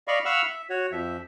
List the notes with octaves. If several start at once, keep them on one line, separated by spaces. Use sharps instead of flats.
D5 D#5 F5 B5 C#6
F5 F#5 B5 C#6 E6 F6
E5
F#4 C#5
F2 F3 E5